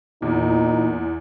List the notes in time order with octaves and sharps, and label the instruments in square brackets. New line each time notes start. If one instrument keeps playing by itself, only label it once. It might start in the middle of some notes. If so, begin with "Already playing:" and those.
[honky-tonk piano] E2 [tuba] A#2 [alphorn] D#4